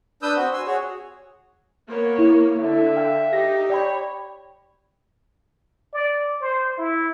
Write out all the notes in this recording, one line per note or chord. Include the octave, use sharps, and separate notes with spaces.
D4 B4 D#6 E6 G6
C4 F#4
G#5 C6 E6
F#4 G#4 C#5
A#3 B3 C#5
E4
D3 E5
F5 G5
D#4 G4 A#6
C#5 D5 G5 B5
D5
C5
E4